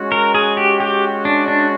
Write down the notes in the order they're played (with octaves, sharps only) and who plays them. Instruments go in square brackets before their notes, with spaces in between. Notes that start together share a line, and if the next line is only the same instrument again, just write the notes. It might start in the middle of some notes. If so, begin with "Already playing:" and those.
Already playing: [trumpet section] G#3 C#4 F#4
[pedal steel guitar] A#4
G#4
G4
G4
D4
D4